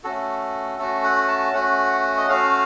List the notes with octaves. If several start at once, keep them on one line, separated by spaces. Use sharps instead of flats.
A3 C#4 F#4 A4
A3 C#4 F#4 A4
F#5
A5
A3 C#4 F#4 F#5
D#5
A3 C#4 F#4 F5